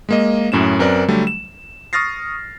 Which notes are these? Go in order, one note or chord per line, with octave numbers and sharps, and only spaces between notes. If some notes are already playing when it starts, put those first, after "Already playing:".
G#3 A#3 D#5
F#2 A2 C#4 E7
F#2 C4 A#4 B4 D5
D3 F#3 G3 A3
E7
C#6 D#6 F6 A6 A#6 C7